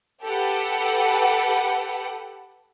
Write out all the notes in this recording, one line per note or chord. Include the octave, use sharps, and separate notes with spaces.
G4 A4 B4 F#5